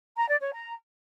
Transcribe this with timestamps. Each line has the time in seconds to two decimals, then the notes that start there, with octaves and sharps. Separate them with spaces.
0.17 A#5
0.29 D5
0.41 C#5
0.53 A#5